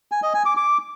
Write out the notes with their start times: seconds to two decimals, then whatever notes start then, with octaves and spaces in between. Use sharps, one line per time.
0.12 G#5
0.23 D#5
0.34 G#5
0.45 D6
0.57 D6